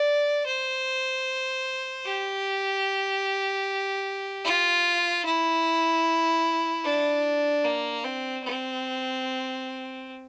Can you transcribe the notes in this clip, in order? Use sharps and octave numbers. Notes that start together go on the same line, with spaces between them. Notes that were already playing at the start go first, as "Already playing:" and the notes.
Already playing: D5
C5
G4
F4
E4
D4
A#3
C4
C4